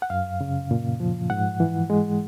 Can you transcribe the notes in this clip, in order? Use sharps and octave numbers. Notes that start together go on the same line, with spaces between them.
F#5
F#2 F5
C#3
A#2
F3
G#2 F#5
E3
G#3